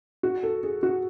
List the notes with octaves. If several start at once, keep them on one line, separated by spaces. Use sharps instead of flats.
F#4
A4
G#4
F#4